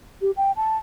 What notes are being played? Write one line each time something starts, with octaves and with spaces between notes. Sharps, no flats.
G4
G5
A5